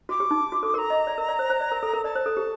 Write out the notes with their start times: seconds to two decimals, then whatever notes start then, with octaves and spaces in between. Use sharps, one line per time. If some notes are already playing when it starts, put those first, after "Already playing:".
0.09 F#4 D6
0.20 G4
0.31 D#4
0.52 F#4
0.63 A4
0.74 A#4 C6
0.78 A#5
0.90 D#5
1.07 D5
1.18 A#4
1.29 D5
1.39 C5
1.50 C5
1.61 D5
1.72 A#4
1.83 A4
1.93 A#4
2.04 D5 A5
2.15 C5
2.26 A4
2.37 G4